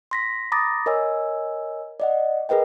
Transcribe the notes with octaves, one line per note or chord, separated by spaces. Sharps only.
C6 A#6 B6
A#5 B5 D6 D#6 A6 A#6
A#4 C#5 D#5 G#5 E6
D5 D#5 F#5
G#4 A#4 B4 D#5 G5